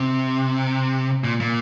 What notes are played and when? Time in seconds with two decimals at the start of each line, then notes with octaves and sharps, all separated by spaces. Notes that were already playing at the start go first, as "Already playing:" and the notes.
Already playing: C3
1.24 A#2
1.40 A#2